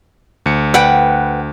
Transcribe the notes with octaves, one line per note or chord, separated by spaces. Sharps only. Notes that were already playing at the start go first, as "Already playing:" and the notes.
D2 C#7
B4 F#5 G5